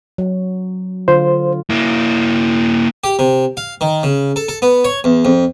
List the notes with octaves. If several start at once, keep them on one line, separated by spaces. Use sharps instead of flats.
F#3
D3 F4 C5
A#3 E4
G4
C3
F5
D#3
C#3
A4
A4
B3
C#5
E2
F2